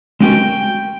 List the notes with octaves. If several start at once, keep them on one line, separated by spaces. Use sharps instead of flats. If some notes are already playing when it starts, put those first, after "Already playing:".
G#3 C#4 F#4 A#4 G5